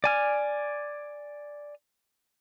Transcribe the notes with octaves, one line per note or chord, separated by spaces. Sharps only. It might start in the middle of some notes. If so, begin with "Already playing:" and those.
D5 G#5 F6